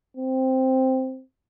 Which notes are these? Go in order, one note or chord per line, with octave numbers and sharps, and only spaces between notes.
C4